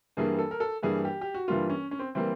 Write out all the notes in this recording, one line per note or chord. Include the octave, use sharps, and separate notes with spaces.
G2 E3 G3 A#3 G#4
A4
A#4
A4
G2 E3 G3 A#3 G#4
G4
G4
F#4
G2 E3 G3 A#3 F4
C#4
C#4
C4
E3 G3 A#3 C4